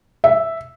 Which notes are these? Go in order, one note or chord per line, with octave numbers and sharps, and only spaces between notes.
E5